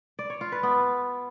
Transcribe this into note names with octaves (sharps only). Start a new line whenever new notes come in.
D5
C#5
F4
B4
B3